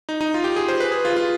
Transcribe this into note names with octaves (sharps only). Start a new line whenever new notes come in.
D#4
D#4
F4
G4
G#4
C5
B4
G#4
F4
F4